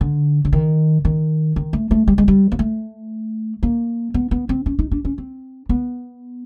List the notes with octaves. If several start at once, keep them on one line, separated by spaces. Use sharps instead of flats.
D3
D3
D#3
D#3
D#3
A3
A3
G3
G#3
G3
A#3
A3
A#3
B3
B3
C4
C#4
D#4
D4
C#4
C4
B3